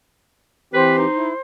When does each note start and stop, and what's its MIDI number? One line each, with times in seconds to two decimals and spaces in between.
0.74 1.06 52
0.74 1.06 60
0.74 1.06 67
0.74 0.95 71
0.74 1.41 72
0.98 1.29 63
1.16 1.33 64